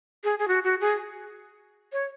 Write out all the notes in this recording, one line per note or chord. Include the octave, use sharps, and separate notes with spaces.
G#4
G#4
F#4
F#4
G#4
C#5